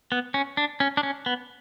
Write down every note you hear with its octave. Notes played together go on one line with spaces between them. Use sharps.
B3
C#4
D4
C#4
D4
C#4
B3